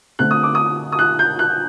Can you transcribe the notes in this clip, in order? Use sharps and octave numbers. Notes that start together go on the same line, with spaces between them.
D3 A3 C4 F#6
D#6
D6
D#6
D#6
F#6
G6
F#6